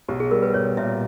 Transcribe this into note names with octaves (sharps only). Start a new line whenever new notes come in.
B1 G4
G#4
G3 A#4
B4
B1 C#5
A#2 E5